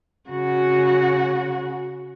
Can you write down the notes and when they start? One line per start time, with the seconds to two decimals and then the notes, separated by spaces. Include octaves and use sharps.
0.29 C#3 F#4